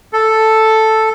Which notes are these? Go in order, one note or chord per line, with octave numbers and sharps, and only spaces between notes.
A4